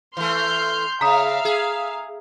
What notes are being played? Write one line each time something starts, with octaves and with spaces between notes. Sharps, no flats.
E3 A3 C6 F6 G6
C#3 E5 F5 A#5 D#6
G#4